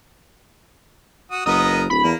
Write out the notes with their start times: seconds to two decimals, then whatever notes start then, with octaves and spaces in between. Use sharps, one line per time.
1.31 F#4 D#6
1.46 F#1 B3 A#4 D#5 D#6
1.90 D1 B5
2.04 E2 A#3